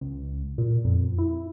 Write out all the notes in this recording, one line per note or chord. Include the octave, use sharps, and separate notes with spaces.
C#2
A#2
F2
E4